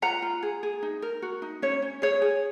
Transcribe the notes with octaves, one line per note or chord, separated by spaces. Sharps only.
F4 F#5 A#5
F4
G#4
G#4
D#4
A#4
F#4
D#4
C#4 C#5
C#4
G#4 C#5
G#4